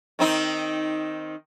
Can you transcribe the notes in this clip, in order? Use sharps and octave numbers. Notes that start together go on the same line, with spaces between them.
D#3 C4 D#4